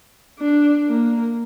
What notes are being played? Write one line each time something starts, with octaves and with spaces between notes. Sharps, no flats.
D4
A#3